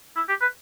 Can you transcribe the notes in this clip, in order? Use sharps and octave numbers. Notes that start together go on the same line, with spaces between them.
E4
G4
B4